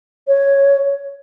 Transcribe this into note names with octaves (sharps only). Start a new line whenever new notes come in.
C#5